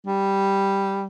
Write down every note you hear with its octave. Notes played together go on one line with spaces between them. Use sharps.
G3